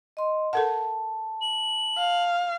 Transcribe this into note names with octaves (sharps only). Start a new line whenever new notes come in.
D#5 C6
A4 A#4 F#5 A5
F#7
F5